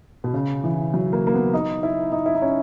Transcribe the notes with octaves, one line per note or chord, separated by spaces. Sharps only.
B2
C#3
E3
F#3
A#3
A#3
B3
D#4
E4
D#4
E4
D#4
C#4